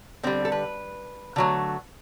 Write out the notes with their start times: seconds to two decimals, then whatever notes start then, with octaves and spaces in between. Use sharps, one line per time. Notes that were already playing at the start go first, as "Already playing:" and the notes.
0.23 D3 G3 C4
0.45 A4
0.52 B4
1.36 D3 F#3 A3